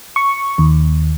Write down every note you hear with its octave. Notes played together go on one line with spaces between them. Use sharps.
C#6
D#2